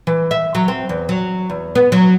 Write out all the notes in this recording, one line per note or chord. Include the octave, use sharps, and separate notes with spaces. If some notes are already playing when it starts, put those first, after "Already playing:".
E3
E5
F#3
C4
E2
F#3
E2
B3
F#3